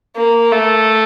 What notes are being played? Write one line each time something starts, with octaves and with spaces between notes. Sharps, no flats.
A#3
A3